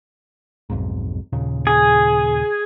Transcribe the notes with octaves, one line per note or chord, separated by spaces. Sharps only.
B1 F2 G#2
D#2 A#2 C#3
G#4